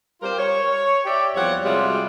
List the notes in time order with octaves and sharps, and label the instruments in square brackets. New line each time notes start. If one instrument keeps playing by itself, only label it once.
[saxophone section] G3 F4 G4 A#4 C5
C#5
G4 D5 E5
E2 F3 G3 C4 C#5 F#5
C3 G3 G#3 F4 F#4